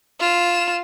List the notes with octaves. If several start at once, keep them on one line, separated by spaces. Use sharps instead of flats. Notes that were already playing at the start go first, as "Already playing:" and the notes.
F4 E7